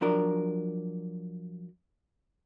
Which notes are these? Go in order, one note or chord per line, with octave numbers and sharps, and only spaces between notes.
F3 F#3 D4 A#4